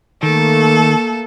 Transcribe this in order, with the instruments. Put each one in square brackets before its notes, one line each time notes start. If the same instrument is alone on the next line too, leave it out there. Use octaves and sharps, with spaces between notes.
[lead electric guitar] D#3 [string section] A3 A#3 [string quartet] A4